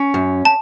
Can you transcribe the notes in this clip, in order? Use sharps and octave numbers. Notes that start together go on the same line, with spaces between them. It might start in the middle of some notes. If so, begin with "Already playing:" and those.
Already playing: C#4
F#2
A5